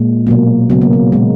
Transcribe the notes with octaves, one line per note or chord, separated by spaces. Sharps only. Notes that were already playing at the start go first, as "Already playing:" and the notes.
Already playing: A#2 G#3
B2 F#3 A#3
C#3 F#3 A#3 B3
A#3
B3
A#2 G#3